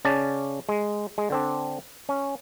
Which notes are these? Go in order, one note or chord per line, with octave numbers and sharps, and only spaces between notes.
C#3 C#4 D5 A5
G#3
G#3
D3 C4 D4
C#4